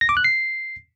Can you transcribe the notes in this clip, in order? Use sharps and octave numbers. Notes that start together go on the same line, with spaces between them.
A#6
D6
F#6
C7